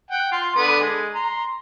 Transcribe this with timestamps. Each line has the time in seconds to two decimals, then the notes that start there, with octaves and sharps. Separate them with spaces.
0.11 F#5 G5
0.32 F4 C6
0.56 D3 B3 B4
0.80 G#3
1.14 A#5 C6